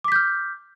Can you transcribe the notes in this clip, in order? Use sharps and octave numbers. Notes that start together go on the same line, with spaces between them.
D6 F6 G6 B6